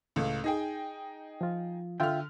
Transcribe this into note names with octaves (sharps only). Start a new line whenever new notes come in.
C#2 A2
D#4 G#4 G5
F3 F4
D3 F4 E5 G5 F6